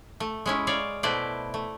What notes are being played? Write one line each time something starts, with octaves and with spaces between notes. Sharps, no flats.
A3
G#3 C#4 E4
C#5 D5 F5
B2 A3 E4 B4 C5 D5
A3